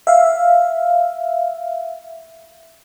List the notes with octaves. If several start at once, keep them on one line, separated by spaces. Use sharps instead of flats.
E5 F5